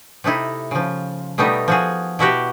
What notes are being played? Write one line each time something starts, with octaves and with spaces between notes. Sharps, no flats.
C3 A3 D#4 E4
C#3 F3
B2 G3 A3 B3 D#4 E5
F3 F#4 G#4
B2 E4 F#4 G4